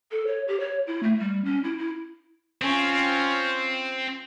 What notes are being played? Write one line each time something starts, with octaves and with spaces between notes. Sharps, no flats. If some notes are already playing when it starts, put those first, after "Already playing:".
A4
C#5
G4
C#5
E4
A3
G3
C#4
E4
E4
C4 C#4 F4